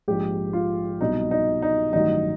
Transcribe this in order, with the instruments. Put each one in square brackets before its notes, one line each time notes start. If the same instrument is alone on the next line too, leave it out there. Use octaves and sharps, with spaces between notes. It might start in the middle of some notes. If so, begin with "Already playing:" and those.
[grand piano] A#1 G#2 F3 G4
F4
C2 B2 F#3 D#4
D#4
D#4
A1 G2 D#3 F#3 D#4